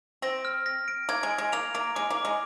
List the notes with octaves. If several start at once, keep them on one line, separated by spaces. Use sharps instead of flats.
C4 A#6
F6
A#6
D7
A#3 G#6
G#3
D7
G#3
A#3 F7
A#3 D7
G#3 D6
A#3
D6
G#3